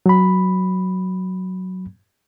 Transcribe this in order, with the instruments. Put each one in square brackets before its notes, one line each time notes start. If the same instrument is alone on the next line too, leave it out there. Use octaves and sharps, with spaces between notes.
[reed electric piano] F#3 B5